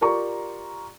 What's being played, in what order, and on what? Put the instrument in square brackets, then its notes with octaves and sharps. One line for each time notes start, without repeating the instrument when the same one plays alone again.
[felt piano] F4 G4 A#4 D5 A#5 C#6